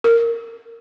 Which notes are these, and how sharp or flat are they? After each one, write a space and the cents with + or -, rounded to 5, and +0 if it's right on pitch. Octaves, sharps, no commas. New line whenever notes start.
A#4 -5